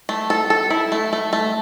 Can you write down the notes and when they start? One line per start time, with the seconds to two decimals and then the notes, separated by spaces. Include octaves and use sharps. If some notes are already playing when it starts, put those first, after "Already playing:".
0.09 A3
0.30 A4
0.50 A4
0.70 E4
0.92 A3
1.13 A3
1.33 A3